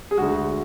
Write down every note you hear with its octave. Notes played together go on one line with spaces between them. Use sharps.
G#4
D2 D3 G#3 F#4